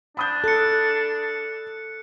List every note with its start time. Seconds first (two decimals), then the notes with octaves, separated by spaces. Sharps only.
0.17 D4 B5 D#6 G6
0.44 A4 F#6 C#7